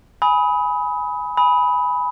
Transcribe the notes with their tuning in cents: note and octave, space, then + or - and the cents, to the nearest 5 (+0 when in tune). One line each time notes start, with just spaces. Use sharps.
G#5 +0 B5 +0 D#6 +30
G#5 +0 B5 +0 D#6 +30